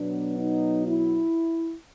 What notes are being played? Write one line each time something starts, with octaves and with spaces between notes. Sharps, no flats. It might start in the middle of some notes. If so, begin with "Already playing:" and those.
Already playing: B2 F#3 B3 D4
D#4
E4